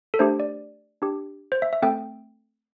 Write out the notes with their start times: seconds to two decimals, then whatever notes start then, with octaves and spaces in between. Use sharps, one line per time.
0.14 A4
0.19 A3 D4 G4 C5
0.40 D5
1.02 D4 G4
1.52 C5
1.62 E5
1.73 E5
1.82 A3 C4 A4 G5